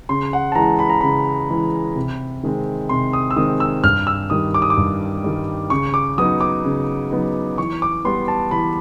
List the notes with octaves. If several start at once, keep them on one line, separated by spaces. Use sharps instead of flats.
C#3 C6
F#5
A5
E3 G#3 A#5
B5
A#5
C#3 B5
E3 G#3
C3
D#3 G#3 C4
C3 C6
D#6
E6
D#3 G#3 C4 D#6
E6
G2 F6
E6
D#3 G3 D#6
D6
D#6
D6
G2
D#3 G3
C#3 C#6
D6
F#3 B3 D#4 D#6
D6
C#3
F#3 B3 D#4
E3 C#6
D6
G3 B3 C6
A5
E3 B5